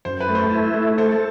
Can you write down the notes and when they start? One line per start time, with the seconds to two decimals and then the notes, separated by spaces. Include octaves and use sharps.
0.05 F#2 C5
0.20 B4
0.28 A3
0.35 C5
0.51 E4
0.74 A3
0.98 A4 C5